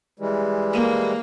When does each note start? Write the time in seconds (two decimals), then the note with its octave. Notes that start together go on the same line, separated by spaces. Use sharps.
0.19 E3 G3 G#3
0.73 A#3